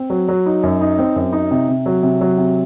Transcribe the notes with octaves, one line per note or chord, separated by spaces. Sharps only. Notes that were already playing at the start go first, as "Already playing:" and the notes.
Already playing: C4
F#3
F#3
D#4
F#2
D#4
C4
F#2
D#4
C3
C3
F#3
C3
F#3
C3